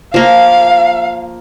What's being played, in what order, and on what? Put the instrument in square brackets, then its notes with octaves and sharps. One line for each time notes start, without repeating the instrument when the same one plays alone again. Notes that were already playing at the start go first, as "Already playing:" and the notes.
[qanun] F3 A#3 [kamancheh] F5